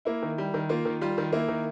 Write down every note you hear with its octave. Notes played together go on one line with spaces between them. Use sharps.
A#3 E4
D#3
G3
D#3
A#3 F4
D#3
G3 F4
D#3
A#3 E4
D#3